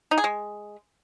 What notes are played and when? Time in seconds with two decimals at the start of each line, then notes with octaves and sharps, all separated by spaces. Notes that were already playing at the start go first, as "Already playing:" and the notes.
0.11 D#4
0.18 G#4
0.24 G#3